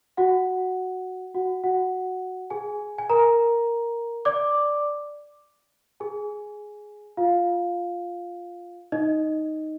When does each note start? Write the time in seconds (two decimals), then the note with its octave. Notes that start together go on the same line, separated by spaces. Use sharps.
0.17 F#4 F#5
1.35 F#4 F#5
1.64 F#4 F#5
2.50 G#4 G#5
2.98 G#5
3.10 A#4 A#5
4.25 D5 D6
6.00 G#4 G#5
7.17 F4 F5
8.92 D#4 D#5